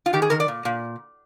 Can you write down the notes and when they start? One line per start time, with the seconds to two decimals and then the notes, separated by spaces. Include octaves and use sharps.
0.06 F4
0.13 D#3 G4
0.22 G#4
0.30 D#3 A#4
0.40 D5
0.48 A#2
0.65 A#2